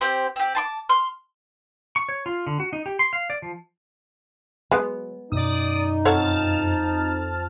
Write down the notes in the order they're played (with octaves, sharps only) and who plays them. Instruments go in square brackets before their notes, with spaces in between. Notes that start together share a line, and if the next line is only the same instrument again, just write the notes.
[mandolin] C4 G4 C5
C4 G4
A5 C6 D6
C6 F6
[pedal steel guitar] C#6
C#5
F4
D3
F#4
D#4
G4
C6
F5
D5
F3
[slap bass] F#3 [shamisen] G#3 B3
[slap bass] F#2 B2 [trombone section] D#4 [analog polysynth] D5 D#6
[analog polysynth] F2 A5 F6 [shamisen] A4 C#5 F#5